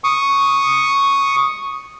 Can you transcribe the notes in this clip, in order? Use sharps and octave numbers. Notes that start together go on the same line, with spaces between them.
C#6 D#6